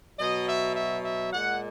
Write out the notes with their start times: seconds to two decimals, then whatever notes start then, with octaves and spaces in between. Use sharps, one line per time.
0.19 B2 F#3 D#5
0.49 E5
0.76 E5
1.05 E5
1.33 A#2 G#3 F#5